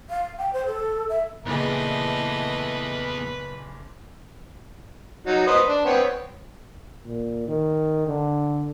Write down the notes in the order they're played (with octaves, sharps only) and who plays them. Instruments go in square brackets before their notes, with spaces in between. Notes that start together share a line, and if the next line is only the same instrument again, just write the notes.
[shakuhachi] F5
G5
C5
A4
E5
[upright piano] F#1 A#2 G#4 [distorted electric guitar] E2 [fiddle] A3 D#5 [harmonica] B4
[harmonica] F#3 D#4
B4 C5 D#5
D4
B3 C4 C#5
[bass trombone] A#2
D#3
D3